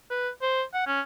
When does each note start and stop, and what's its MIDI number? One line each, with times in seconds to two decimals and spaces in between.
0.11 0.29 71
0.42 0.63 72
0.74 0.86 78
0.87 1.01 61